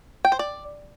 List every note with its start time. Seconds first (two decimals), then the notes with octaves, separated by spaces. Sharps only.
0.25 G5
0.32 C5
0.39 D5